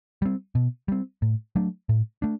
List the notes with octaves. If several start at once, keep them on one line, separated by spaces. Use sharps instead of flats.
G3 C4
B2
G3 C4
A2
F#3 A3 D4
A2
A3 D4